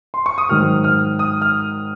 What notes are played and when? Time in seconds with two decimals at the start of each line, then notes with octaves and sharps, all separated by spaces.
0.14 C6
0.26 C#6
0.38 D#6
0.49 G#2 D#3 F#3 F6
0.84 F6
1.19 D#6
1.42 F6